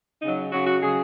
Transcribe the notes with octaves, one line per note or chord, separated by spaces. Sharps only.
C#3 F#3 D#4
C#3 F#3 F#4
F#4
C#3 F#3 G#4